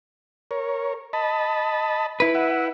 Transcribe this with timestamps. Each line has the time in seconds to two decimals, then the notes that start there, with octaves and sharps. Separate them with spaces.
0.51 A#4 C#5
1.13 D#5 A5 B5
2.20 E4 B4
2.35 E5 F#5